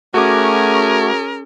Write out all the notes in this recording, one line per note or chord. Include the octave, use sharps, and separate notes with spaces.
A3 C#4 F#4 G#4 A#4 D6